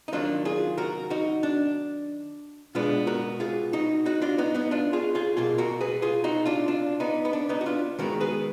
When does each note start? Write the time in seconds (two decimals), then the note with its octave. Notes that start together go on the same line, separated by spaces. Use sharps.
0.08 D#4
0.12 D#3 F#3 A#3 D4 F4
0.45 F4 G#4
0.78 F#4 A#4
1.10 D#4 F#4
1.43 D4
2.75 B2 G#3 B3 D4 F4
3.07 F#4 A#4
3.40 F4 G#4
3.73 D#4 F#4
4.06 D#4 F#4
4.22 D4 F4
4.38 B3 D#4
4.54 B3 D#4
4.71 D4 F4
4.93 F4 G#4
5.15 F4 G#4
5.37 B2 A#3 F4 G#4
5.58 F#4 A#4
5.81 G#4 B4
6.02 F4 G#4
6.24 D#4 F#4
6.46 D4 F4
6.68 D4 F4
7.00 B3 D#4
7.25 B3
7.33 D4
7.49 B3 D#4
7.61 F#4
7.66 D4 F4
7.99 D#3 G#3 B3 F#4 A#4
8.20 G#4 B4